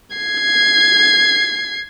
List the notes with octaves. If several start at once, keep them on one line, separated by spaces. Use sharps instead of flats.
G#6 C7